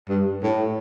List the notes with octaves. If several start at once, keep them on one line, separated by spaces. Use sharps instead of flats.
G2
A2